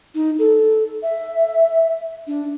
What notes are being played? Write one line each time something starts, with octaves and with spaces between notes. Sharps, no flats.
D#4
A4
E5
D4